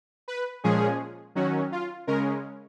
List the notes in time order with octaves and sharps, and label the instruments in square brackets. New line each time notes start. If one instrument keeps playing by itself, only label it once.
[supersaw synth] B4
A#2 F3 G#3 C#4 G#4
D#3 F#3 C#4 F#4
F4
C#3 G#3 C#4 A#4